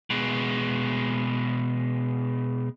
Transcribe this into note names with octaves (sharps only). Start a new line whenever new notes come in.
B2 G#3